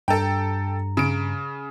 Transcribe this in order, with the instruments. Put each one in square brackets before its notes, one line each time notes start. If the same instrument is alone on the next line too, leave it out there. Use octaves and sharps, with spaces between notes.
[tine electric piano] G2 A#5 [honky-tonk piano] A4 G5
[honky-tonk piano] C#3 D7